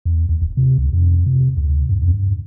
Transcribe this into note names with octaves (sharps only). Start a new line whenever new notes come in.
E2
D#2
D#1
C3
C#2
F2
C3
D2
G2
F2
G2